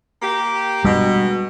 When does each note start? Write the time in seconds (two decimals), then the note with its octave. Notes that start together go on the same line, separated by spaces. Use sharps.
0.21 A#3 G4
0.84 B2 G3 G#3 D4